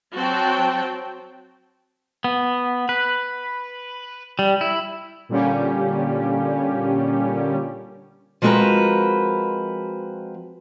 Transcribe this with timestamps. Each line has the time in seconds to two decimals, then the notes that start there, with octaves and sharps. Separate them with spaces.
0.15 F#3 C4 F#4 G5 A5
2.24 B3
2.89 B4
4.39 G3
4.61 E4
5.29 A#2 D3 G3 A#3 C#4 G4
8.42 F3 G#3 C4 F#4 A#4 B4